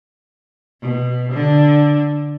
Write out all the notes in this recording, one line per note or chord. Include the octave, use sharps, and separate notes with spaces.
B2
D3